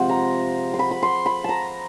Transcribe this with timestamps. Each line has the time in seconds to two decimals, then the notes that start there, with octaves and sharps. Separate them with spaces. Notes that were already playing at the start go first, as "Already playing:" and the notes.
Already playing: C3 F3 G#3 C5 F#5
0.09 A#5
0.74 C6
0.79 B5
0.91 B5
1.03 C6
1.26 B5
1.44 A5 A#5